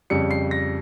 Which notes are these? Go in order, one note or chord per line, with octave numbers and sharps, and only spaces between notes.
F2 C#3 G3 C#7
C7
A#6